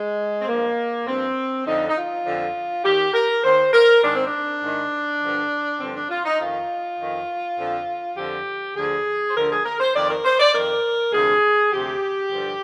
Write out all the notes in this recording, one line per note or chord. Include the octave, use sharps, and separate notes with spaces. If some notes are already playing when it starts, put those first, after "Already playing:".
Already playing: G#3
C4
G2 F3 A#3
G2 F3 C4
F2 D3 F3 D#4
D#4
F4
F2 D3 F3
D#2 D#3 G4
A#4
D#2 D#3 C5
A#4
G#2 D#3 D4
C4
D4
G#2 D#3
G2 D3 F3
G2 D3 F3 C4
D4
F4
D#4
F2 D#3 F4
F2 D#3
F2 D3 F3
F2 D3 F3 G4
D2 D3 F3 G#4
C5
D2 D3 F3 A#4
G#4
A#4
C5
F2 D#3 D5
A#4
C5
D5
F2 D#3 A#4
D2 C3 F3 G#4
D2 C3 F3 G4
G2 D3 F3